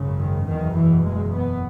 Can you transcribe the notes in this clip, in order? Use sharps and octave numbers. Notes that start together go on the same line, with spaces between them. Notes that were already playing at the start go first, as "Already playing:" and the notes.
Already playing: G#1 F#2 C#3
D#3
F#1 E2 B2 D#3
E3
G#3
B3